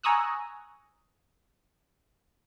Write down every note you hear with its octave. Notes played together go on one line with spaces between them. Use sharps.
G#5 A#5 C#6 D#6 E6 F#6